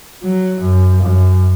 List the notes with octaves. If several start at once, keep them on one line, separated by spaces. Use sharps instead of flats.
F#3
F#2
F#2